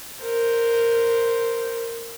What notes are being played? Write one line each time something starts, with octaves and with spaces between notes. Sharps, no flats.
A#4 C5